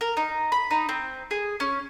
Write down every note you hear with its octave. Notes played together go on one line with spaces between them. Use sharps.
A#4
D#4
B5
D#4
C4
G#4
C#4